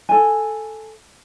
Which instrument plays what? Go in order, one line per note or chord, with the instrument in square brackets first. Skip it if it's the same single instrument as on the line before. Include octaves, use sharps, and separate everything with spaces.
[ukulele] A4 G#5